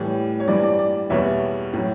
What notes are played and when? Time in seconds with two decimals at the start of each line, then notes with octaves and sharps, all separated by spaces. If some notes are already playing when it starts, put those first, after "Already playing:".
Already playing: A2 E3 G3 C#5
0.40 C#5
0.48 G2 E3 G3 D5
0.64 D5
0.79 D5
1.10 E2 B2 G3 C#5 E5
1.73 A2 F#3